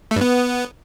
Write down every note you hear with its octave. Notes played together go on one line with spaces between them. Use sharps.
A3
G2
B3